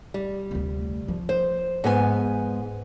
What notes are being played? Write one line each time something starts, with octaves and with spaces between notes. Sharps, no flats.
G3
F1 D2
F3
C5
G#2 B3 G#5